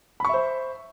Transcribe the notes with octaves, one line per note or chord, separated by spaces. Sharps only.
C5 E5 B5 C#6